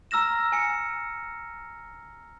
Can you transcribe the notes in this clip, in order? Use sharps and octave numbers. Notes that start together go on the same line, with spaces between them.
A#5 E6 F6 A#6 E7
G#5 C#7